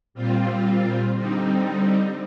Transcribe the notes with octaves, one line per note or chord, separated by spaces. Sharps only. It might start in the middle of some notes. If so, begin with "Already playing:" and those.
A#2 G3 C4 F4
D3 G3 C4 D#4